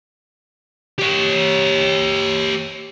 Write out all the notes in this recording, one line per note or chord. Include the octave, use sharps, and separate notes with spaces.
G4 C#5